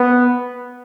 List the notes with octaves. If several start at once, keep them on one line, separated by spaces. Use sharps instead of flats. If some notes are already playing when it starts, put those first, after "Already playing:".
Already playing: B3